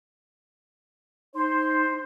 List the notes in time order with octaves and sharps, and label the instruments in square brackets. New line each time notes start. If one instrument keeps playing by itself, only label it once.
[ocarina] D#4 [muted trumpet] C5 [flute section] C6